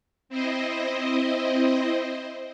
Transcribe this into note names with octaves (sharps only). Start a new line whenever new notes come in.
C4 E4 C5 D#5